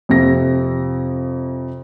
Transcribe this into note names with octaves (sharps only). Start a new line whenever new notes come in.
F2 C3 A#6